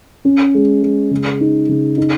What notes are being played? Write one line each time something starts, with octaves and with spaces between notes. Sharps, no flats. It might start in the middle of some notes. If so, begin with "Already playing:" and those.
C#4
G#3
G#3
C#3
D#4
C#3
D#4